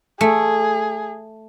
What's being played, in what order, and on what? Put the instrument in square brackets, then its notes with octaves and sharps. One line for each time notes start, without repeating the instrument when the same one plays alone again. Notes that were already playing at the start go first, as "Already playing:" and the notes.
[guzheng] A3 [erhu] G#4